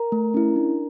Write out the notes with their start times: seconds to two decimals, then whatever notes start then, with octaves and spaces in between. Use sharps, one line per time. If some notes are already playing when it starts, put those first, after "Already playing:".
Already playing: A#4 A#5
0.12 A3
0.34 C#4 E4
0.56 D4